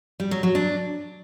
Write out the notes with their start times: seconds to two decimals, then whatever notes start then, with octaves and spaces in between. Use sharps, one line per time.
0.20 G3
0.31 F#3
0.43 F#3
0.55 D4